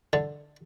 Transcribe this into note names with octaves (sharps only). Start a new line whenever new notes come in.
D3